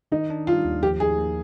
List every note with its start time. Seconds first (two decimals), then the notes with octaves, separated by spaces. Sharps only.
0.12 D#3 D#4
0.30 D4
0.47 G3 F4
0.65 D#2
0.83 F3 G4
1.00 D#4 G#4
1.18 A#3